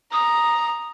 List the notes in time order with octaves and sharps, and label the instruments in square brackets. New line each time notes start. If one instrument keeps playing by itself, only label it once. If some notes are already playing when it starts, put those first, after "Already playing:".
[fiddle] A#5 [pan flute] D#6